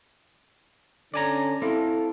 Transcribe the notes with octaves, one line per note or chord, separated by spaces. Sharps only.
D3 C#4 D5 G#5 A#5
C4 E4 F4 A4